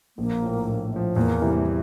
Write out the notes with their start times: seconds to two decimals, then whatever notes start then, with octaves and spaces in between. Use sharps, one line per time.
0.17 A#1 A#3
0.42 A2 F3
0.67 A#1
0.92 A2 F3
1.16 E2 A#3
1.41 C3 E3 G3